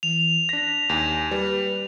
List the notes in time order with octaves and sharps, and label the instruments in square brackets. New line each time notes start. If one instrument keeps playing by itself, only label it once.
[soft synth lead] E3 [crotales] F7
[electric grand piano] D4 A#6 [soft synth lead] B6
[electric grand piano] D#2 [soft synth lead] G#5
[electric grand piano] G3 [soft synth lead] B4